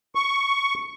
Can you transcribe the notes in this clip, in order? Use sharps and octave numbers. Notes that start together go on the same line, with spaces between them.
C#6